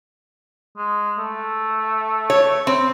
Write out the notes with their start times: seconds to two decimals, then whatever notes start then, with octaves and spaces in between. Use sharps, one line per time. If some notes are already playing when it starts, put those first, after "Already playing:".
0.77 G#3
1.18 A3
2.30 C#5
2.67 C4